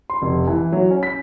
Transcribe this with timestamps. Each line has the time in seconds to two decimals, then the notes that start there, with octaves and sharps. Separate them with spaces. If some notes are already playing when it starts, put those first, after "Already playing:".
0.10 C6
0.22 F1
0.48 E3
0.72 F#3
0.91 C#4
1.03 B6